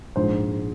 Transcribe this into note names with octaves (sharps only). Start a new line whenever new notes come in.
A#1 G#2 F3 G#3 C5